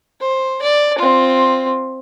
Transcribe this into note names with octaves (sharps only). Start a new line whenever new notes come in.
C5
D5
C4 F4